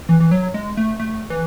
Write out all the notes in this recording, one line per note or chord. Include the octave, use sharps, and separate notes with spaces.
E3
E3
F#3
G#3
A3
A3
E3